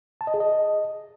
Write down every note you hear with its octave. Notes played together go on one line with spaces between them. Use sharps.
A5
D#5
G#4
D#5